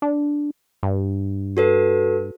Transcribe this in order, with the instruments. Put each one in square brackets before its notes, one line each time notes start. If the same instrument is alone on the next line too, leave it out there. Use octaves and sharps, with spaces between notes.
[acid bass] D4
G2
[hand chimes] F#4 A4 B4